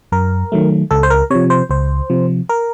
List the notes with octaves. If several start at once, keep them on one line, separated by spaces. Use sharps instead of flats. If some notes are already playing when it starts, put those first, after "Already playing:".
F#2 A#4
D#3 F#3 A3
C#2 A4
C5
A#4
C3 F3 C#5
C5
C#2 C5
C3 F3
A#4